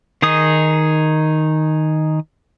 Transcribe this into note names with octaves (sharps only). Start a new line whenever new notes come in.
D#3 D#4 G#4 D#6